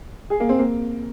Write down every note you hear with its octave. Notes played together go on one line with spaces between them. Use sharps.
G#4
A#3
C4
A#3